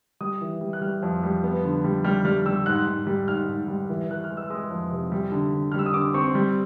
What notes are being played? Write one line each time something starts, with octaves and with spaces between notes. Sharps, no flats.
G3 D#6
E3
G3
F#6
G3 F6
F2
G3
B3
D3
G3
G3 F6
G3 F6
G3 E6
G#2 F#6
G#2
G3
G#2 F6
G#2
G3
E3
E3 F#6
F6
G#3
E6
G#3 D#6
F2
C3
G3
D3
D3
G3 F6
E6
D#6
D3 D6
C4 C#6
G3